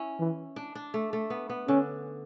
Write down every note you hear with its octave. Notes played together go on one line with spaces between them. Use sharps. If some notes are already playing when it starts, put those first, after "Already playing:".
Already playing: C#4 E4
E3
D4
D4
A3
A3
B3
B3
D3 C#4